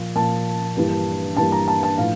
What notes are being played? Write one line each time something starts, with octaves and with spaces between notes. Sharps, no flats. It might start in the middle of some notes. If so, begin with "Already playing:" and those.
Already playing: A#2 F3 A#3
A#2 F3 A#3 A5
G2 E3 G3 A#3
G2 E3 G3 A#3 A5
A#5
A5
A5
A2 F3 F5